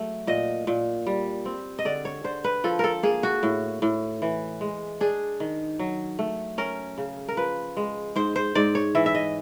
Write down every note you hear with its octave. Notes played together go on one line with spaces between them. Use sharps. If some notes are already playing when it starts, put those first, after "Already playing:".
Already playing: F#3 A3
A#2 D#5
A#2
G3
C4
D#5
D3 D5
C#5
D3 C5
B4
F3 A4
A4 A#4
A#3 G#4
F#4
A2
A2
E3
G#3
D4 G#4
D#3
F#3
A3
C#4 A#4
C#3
A#4
F3 B4
G#3
G#2 C5
C5
G#2 D5
C#5
E3 E5
E5
D#5